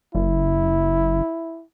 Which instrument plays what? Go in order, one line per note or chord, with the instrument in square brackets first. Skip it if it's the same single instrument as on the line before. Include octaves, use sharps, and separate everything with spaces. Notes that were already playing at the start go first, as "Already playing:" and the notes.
[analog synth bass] F#1 [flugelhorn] E4